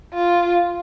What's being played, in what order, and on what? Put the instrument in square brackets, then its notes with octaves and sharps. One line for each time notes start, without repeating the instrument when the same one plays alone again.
[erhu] F4